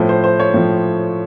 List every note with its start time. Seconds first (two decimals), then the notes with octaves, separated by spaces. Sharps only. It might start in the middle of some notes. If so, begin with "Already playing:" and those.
Already playing: A2 F3
0.09 C5
0.24 C5
0.40 C#5
0.54 A2 F3